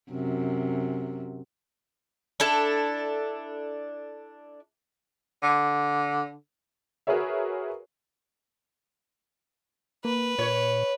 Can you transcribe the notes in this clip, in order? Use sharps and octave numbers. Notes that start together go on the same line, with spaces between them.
F#2 C3
D4 E4 A4
D3
F#4 G#4 A#4 B4 C#5 E5
A#3 B4
A#2 C#5